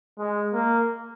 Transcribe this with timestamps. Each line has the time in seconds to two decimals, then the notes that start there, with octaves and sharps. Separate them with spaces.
0.19 G#3
0.53 A#3